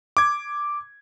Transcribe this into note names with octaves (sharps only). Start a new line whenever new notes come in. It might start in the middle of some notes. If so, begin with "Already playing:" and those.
D6 G#6